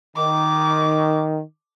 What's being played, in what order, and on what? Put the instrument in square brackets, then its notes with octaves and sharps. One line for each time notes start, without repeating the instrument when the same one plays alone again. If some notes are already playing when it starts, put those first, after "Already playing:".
[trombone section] D#3 [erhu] D6